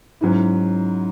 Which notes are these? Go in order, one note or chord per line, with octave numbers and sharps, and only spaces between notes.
G#2 F#3 C#4 E4